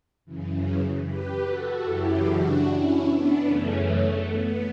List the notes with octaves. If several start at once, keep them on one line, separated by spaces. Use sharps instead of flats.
F#2 C#3 E3
G4 B4
F#4 A4
F#2 C#3 E3 E4 G4
D4 F#4
C#4 E4
B3 D4
F#2 C#3 E3 A3 C#4
A3
B3